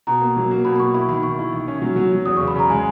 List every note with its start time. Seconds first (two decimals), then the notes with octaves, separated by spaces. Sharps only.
0.07 B2 A#5
0.21 A#3
0.37 F#3
0.51 A#3
0.65 B2 B5
0.76 B5
0.79 B2 C#6
0.94 E4 B5
1.09 D#3 B5
1.23 D#3 C#6
1.39 E4
1.53 D#3
1.68 C#4
1.82 F#3
1.96 F#3
2.12 F#3
2.26 E2 D#6
2.37 C#3 C#6
2.48 B5
2.55 C#3 A#5
2.70 G#3 G#5